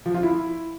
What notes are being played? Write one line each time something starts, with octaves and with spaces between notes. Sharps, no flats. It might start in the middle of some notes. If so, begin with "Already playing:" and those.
F3
F4
E4